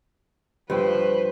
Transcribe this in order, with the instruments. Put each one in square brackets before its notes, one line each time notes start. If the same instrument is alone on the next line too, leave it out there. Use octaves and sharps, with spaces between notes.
[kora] G2 F3 G5 [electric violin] B4 C5